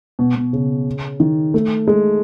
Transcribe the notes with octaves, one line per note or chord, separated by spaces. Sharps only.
B2
B2
C#3
D#3
A3
G#3